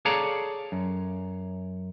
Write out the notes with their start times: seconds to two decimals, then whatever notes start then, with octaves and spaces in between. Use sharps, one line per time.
0.05 G#4 A4 C#5 D5 F5 A#5
0.72 F#2